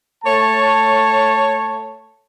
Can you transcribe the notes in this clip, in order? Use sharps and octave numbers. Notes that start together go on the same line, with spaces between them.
A3 C#5 A5